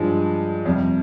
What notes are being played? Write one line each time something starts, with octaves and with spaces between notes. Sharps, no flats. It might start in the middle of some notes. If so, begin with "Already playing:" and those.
Already playing: G2 F3 G#3
F2 C3 G3